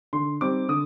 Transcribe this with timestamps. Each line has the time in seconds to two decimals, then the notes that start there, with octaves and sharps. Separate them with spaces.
0.13 D3 C6
0.41 G3 C4 D#4 D6
0.68 D3 D#6